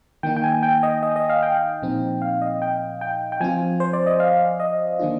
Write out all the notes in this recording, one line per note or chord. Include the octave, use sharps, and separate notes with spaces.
D#3 A#3 D#4 G5
G5
G#5
G5
D#5
D#5
D#5
F5
G5
A#2 F3 C4 D#4
F5
D#5
G5
G5
G5
F3 C4 F4 G#5
C5
D5
D#5
F5
D#5
D#3 A#3 D4 F4